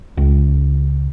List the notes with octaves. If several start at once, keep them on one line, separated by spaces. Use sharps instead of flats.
C#2